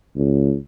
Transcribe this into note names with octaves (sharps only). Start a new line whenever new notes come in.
C#2